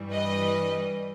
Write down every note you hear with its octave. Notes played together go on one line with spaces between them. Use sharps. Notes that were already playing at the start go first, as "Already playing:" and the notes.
Already playing: G2 E3 G3
B4 D#5